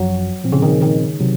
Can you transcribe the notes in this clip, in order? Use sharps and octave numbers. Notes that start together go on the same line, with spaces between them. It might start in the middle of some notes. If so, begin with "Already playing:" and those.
Already playing: G#1 F#2 F3 F#3
A#2 F3 C4
C#3
D#3
D#3
C3 F#3